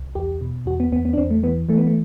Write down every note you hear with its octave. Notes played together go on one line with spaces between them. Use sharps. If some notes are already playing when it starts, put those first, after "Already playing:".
Already playing: C2
E2 G4
B2
E2 F#4
B3
E2 B3
B3
D4
E2 C4
A3
E3 B3
E3 A3
B3
A3